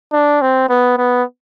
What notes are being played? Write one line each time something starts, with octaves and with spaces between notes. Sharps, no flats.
D4
C4
B3
B3